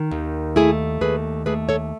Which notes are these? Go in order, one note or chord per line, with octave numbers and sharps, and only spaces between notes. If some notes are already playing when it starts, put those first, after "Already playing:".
Already playing: D#3
D#2
A3 E4 G#4
D#2 G#4 B4
A3 G#4 B4
A4 C#5